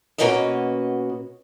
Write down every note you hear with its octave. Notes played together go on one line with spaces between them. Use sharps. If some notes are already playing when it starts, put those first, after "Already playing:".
B2 A#3 C#4 F#4 B4 D#5